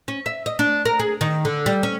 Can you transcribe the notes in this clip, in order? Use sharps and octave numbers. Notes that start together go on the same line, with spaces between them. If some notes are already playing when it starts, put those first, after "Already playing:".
C#4
E5
D#5
D4
A#4
G#4
D#3
D3
G3
C#4